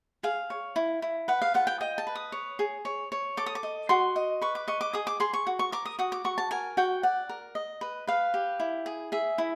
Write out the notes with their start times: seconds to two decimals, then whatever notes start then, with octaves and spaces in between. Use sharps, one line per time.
0.23 G#4 F5
0.50 C#5
0.76 E4
1.02 E4
1.28 B4 F#5
1.42 F5
1.54 F4 F#5
1.67 G5
1.81 D#5 G5
1.98 A5
2.07 B4
2.15 D#6
2.32 C#5
2.59 G#4
2.85 C#5
3.12 C#5
3.37 A4 D6
3.46 D#6
3.55 D6
3.63 D#5
3.89 F#4 C6
4.16 D#5
4.42 B4 C#6
4.55 D6
4.68 D#5 C#6
4.81 D6
4.93 G#4 D#6
5.07 D6
5.20 G#4 C6
5.33 C#6
5.47 F#4
5.59 C#6
5.72 A#4 D6
5.85 D#6
5.99 F#4 D#6
6.12 D6
6.24 F#4 C#6
6.38 A5
6.51 A#4 G#5
6.77 F#4 G5
7.03 D5 F#5
7.29 A#4
7.55 D#5
7.81 B4
8.07 B4 F5
8.34 G4
8.60 E4
8.86 G#4
9.12 G#4 E5
9.38 E4